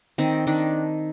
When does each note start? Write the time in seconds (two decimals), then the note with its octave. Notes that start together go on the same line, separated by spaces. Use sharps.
0.18 D#3 C4
0.47 D#3 D4